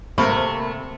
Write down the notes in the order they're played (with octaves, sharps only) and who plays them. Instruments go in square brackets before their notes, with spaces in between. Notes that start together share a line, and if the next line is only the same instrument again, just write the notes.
[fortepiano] C3 [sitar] A3 [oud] A#3 [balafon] C5 B5 C#6